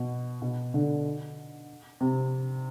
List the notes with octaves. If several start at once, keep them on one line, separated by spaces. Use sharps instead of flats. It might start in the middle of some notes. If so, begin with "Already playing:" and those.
Already playing: B2
B2
D3
C3